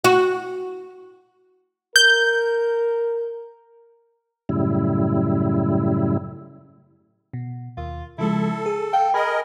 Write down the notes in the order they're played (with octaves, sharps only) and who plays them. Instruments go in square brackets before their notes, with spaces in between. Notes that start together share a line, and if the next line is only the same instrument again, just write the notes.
[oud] F#4
[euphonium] A#4 [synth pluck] G6
[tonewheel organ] F#2 A2 C#3 G3 E4
[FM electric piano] B2
[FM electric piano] D#2 [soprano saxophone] F4
[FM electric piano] C#3 F3 G#3 [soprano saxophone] E4 [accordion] A4
[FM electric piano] G#4
[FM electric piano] F5 [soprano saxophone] G5
[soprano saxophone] G#4 [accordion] A#4 D#5 [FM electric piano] G#5 B5